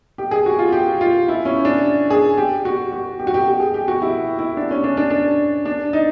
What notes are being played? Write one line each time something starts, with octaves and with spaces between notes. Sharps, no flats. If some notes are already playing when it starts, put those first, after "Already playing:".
G4
G#4
F#4
F4
G4
F4
E4
C#4
D4
G#4
G4
F#4
F#4
G4
F#4
G4
G4
G#4
G4
F#4
E4
E4
D4
C#4
D4
D4
D4
D4
D#4